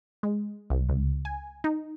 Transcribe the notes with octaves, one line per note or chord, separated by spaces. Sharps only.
G#3
C2
C#2
G#5
D#4